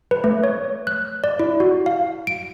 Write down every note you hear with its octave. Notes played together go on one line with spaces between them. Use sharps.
B4
A3
C#5
F#6
D5
E4
F#4
F5
D7